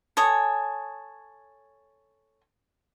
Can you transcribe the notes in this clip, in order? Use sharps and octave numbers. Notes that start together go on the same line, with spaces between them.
A4 C#5 G#5 D#6